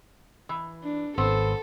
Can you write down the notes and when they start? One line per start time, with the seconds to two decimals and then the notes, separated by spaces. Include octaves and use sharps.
0.49 E3
0.83 D4
1.18 G#1 B3 C4 A4 C5